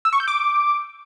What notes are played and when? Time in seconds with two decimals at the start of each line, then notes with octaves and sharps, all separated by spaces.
0.05 E6
0.13 C#6
0.20 G6
0.28 D6